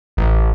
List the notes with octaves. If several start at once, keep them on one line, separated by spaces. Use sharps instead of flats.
A1